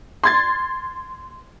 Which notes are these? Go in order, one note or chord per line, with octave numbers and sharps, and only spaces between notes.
C6 G#6 A6